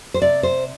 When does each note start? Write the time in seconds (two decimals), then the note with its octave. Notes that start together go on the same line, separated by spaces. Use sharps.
0.14 C5
0.22 C3 D5
0.43 C5